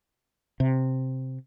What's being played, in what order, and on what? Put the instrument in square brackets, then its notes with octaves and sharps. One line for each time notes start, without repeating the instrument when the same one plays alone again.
[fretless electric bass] C3